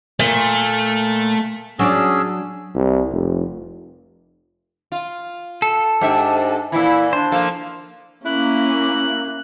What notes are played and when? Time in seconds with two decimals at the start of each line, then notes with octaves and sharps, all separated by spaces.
0.20 A#2 A3
1.79 F#3 C#4 D4 G#4 D5 E6
2.75 C2
3.13 F1
4.92 F4
5.62 A4
6.01 G#2 D4 G4 E5
6.72 A#2 E3 E4
7.13 D4 C5
7.32 F3 A#3 A4
8.26 A#3 C#4 E4 F#6